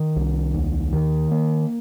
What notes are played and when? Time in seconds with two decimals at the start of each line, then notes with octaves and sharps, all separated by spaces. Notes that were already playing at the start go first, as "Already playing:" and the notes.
Already playing: D#3
0.16 C2
0.54 D#2
0.93 D#3
1.31 A#3